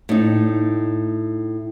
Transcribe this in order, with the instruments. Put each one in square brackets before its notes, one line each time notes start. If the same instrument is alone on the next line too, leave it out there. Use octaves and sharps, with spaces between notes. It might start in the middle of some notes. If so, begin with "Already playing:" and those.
[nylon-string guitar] A2 D#4